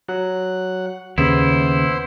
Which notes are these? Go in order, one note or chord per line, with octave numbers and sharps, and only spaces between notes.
F#3 F#5
D#2 C#3 B3 E4 C5